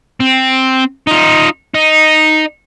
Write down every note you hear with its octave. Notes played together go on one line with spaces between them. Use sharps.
C4
D#4 F4
D#4